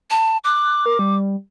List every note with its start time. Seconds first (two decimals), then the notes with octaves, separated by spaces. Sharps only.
0.11 A5
0.44 D6 F#6
0.86 A#4
0.99 G3